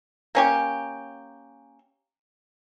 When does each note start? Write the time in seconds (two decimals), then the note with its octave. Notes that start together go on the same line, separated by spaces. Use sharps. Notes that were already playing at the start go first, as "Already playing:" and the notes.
0.35 A#3 C#4 G4